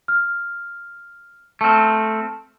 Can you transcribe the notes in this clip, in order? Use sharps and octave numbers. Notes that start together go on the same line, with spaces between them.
F6
A3 C4 A5 F6